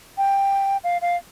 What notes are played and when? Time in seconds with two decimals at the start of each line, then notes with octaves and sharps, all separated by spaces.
0.17 G5
0.84 F5
1.02 F5